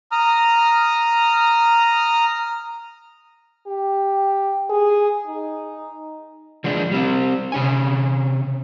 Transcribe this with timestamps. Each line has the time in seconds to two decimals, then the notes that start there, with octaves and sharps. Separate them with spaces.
0.12 A#5 D#6 F6
3.67 G4
4.70 G#4
5.27 D#4
6.64 F3 G#3 D4
6.91 G3 C4
7.52 C3 C#4 G#5